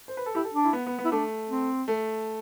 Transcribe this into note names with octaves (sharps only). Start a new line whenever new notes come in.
C5
B4
A4
E4 G4
A4
D4
E4
B3
B3
B3
E4
A3 D4
C4
A3